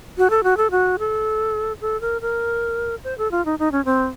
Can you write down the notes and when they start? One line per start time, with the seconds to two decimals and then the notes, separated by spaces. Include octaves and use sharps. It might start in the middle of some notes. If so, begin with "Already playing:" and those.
0.18 F#4
0.30 A4
0.44 F#4
0.57 A4
0.71 F#4
0.99 A4
1.81 A4
2.01 A#4
2.21 A#4
3.04 C5
3.18 A4
3.31 F4
3.45 D#4
3.59 D#4
3.72 C#4
3.85 C4